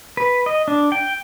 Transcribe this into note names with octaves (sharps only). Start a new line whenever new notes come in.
B4
D#5
D4
G5